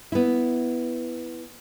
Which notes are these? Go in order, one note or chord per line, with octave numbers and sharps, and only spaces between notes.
B3 E4